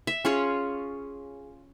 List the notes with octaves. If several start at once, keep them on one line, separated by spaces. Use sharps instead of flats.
E5
C#4 F4 G#4 C#5